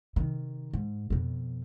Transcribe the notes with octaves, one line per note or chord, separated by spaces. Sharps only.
C3 D#3
G#2
F2 B2